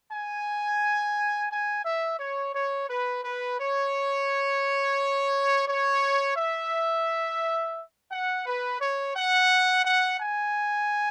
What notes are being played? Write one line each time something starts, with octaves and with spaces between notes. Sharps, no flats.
G#5
G#5
E5
C#5
C#5
B4
B4
C#5
C#5
E5
F#5
B4
C#5
F#5
F#5
G#5